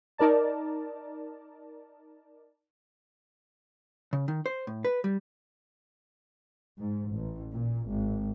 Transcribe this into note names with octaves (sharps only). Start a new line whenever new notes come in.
D#4 A#4 D5 A5
C#3
D#3
C5
A2
B4
G3
G#2
A1
A#2
G#1